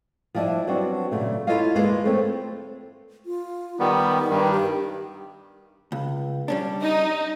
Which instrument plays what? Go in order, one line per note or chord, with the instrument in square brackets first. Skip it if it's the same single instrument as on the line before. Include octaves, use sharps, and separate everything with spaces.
[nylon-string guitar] F3 G3 D4 E4 D#5
F#3 G3 B3 C4 D4 F#4
A#2 C#3 A3
E4 F4 A4 C#5 D#5 F5
D2 G#3 A#3 F4 B4
A3 C4 A4 C#5
[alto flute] F4
[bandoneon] D#3 G3 B3 [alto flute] D#4
[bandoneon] G2 D#3 G3
[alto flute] G4
[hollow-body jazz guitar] C#2
G3 C#4 D4
[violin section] D#4 [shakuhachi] D#5